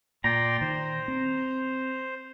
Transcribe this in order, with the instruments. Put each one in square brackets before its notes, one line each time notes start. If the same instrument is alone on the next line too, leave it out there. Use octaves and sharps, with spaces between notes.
[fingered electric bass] A#2 [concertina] D5 G5 C6 [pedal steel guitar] A#5
[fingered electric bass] D#3 [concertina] C5
[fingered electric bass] C4